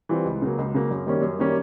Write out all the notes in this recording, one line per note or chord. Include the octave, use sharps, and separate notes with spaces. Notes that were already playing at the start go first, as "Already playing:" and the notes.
E3 G3 C4 F4
C#2
C#3 F#3 A#3
C#2
C#3 F#3 A#3
F#2
D#3 G3 A#3 C#4
F#2
D#3 G3 A#3 C#4